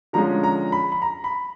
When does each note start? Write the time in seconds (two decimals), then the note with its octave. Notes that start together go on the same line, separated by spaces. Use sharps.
0.13 D3 F3 G#3 C#4 A#5
0.44 A#5
0.72 B5
0.92 B5
1.02 A#5
1.24 B5